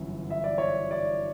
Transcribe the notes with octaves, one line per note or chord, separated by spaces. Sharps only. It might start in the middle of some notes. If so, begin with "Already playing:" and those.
Already playing: G1 F#2 E3
E5
D5
C#5
D5